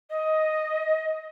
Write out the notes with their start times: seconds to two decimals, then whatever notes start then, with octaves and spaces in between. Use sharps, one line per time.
0.10 D#5